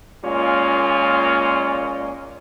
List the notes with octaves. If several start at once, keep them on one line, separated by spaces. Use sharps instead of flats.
A#2 G#3 A#3 C#4 F4